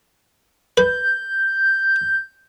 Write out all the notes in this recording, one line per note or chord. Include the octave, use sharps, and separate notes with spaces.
B4 G6